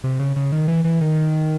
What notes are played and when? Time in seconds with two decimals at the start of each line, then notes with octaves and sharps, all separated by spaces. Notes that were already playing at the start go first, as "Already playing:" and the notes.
0.04 C3
0.20 C#3
0.36 C#3
0.52 D#3
0.68 E3
0.85 E3
1.01 D#3